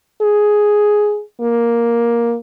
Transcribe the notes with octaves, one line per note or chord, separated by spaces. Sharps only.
G#4
A#3